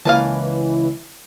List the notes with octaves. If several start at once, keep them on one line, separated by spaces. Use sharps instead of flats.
C#2 E3 A#3 B4 F5 G#5 A5